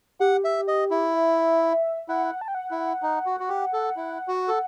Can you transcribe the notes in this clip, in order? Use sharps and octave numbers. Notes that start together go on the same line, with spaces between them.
G4 F#5
E5
D#5
E4
E5
E4 F#5
A5
G5
F#5
E4
D#4
F#4
F#4
G4
A4
E4
F#4
A4